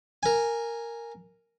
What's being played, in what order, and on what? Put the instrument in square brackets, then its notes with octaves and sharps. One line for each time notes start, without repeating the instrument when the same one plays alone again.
[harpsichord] A#4 G#5